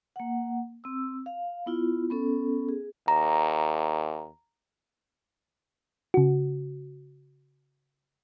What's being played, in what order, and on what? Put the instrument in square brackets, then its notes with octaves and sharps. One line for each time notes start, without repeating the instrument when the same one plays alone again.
[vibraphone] A#3 F#5
C4 E6
F5
B3 E4 F4
B3 C#4 A4
G#4
[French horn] D#2 [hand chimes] A#5
[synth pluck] C#3 F#4